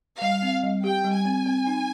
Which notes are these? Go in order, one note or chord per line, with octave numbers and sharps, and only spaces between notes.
G3 F5
C4
G3
G4 G5
G3
G#5
C4
C4
D#4